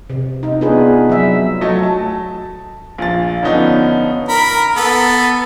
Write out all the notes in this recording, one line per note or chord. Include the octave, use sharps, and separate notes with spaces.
C3
D#4
B3 D4 F4 G#4 B4
F#3 E5
F#3 A3 D#5
A5
A#1 F4 A6
D3 F3 B3 C#4 D#4
A#4 B5
B3 A4